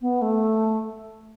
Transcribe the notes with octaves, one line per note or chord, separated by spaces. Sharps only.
B3
A3